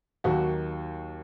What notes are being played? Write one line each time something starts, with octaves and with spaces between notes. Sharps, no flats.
D#2 D#3 F#3 A#3 F#4